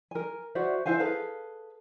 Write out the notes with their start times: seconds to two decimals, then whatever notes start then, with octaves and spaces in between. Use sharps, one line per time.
0.11 A#4 G#5
0.55 F#4 C5 D5 E5
0.86 E4 C5 F5 G#5
0.99 G#4 A4 B4 F5